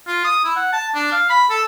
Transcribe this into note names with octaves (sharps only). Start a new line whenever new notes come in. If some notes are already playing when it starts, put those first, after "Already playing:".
F4
D#6
E4
F#5
A5
D4
F5
B5
A4